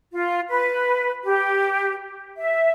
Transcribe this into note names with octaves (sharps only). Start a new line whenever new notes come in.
F4
B4
G4
E5